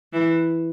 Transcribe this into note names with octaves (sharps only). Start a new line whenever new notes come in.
E3